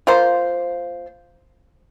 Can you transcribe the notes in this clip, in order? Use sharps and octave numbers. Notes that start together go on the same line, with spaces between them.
A#3 F4 C5